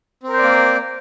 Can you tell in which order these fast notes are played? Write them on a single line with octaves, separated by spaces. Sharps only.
C4 A#4 C5 D5 A#3